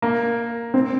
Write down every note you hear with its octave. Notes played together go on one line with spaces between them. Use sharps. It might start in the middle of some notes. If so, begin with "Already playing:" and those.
A#3
C4